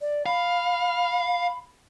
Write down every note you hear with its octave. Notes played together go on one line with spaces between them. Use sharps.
D5
F5 B5